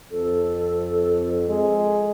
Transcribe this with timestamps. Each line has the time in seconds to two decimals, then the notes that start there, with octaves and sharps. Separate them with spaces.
0.12 F2 A4
1.48 G#3